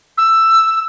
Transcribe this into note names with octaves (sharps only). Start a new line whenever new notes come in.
E6